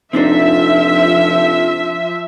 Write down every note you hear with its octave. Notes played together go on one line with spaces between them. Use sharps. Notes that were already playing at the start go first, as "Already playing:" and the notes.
F1 F3 C4 D4 D#4 E5